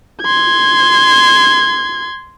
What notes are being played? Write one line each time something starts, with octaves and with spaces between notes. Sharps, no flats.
C6 G#6